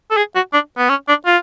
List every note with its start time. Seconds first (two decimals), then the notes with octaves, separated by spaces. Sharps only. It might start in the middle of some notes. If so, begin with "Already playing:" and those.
0.11 A4
0.17 G#4
0.35 F#4
0.53 D4
0.78 B3
0.89 C#4
1.08 D4
1.26 F4